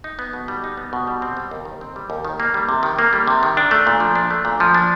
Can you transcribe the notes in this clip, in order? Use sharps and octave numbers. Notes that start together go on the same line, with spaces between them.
D#4
B3
B2
G3
D#4
B3
B2
G3
C4
G3
D#2
D#3
C4
G3
D#2
D#3
A#3
G3
C3
D#3
A#3
G3
C3
D#3
D4
A3
A#2
F3
D4
A3
A#2
F3
D4